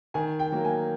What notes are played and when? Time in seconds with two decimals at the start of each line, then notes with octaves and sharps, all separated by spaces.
0.14 D#3 G#5
0.39 G5
0.52 F#3 A#3
0.64 G#5